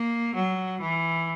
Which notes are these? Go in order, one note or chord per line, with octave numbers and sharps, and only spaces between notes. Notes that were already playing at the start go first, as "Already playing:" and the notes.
Already playing: A#3
F#3
E3